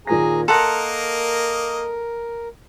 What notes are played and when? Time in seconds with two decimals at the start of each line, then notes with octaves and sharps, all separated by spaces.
0.07 D#2 A#2 G#4 G#5 A#5 A#6
0.48 A#3 A4 A#4 D#5 F#5 A#5 C6